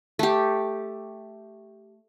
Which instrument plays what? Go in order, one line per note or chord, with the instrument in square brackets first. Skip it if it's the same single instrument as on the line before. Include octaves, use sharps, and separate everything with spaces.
[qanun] A3 G4